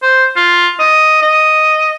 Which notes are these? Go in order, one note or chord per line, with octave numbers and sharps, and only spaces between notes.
C5
F4
D#5
D#5